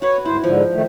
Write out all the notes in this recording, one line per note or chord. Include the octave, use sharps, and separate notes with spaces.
F#4 B4 C#5
D2 G#2 E4 C5
G#2 D3 F3
D#3 A3